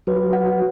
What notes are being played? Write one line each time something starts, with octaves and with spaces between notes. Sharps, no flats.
F#3 B4
F#5